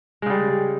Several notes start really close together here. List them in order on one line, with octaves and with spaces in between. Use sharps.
G#3 C#3 G3